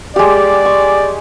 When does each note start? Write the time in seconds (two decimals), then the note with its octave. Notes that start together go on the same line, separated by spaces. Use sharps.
0.16 G#3 G4 D5
0.65 C#6